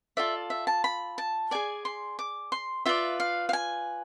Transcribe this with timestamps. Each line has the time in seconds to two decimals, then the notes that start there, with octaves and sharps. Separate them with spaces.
0.17 F4 A4 D5 E5
0.50 E5
0.67 A5
0.84 B5
1.18 A5
1.51 G#4 D5 G#5
1.85 C6
2.19 D6
2.52 C6
2.86 F4 B4 D5 E5
3.20 F5
3.49 F5
3.53 G#5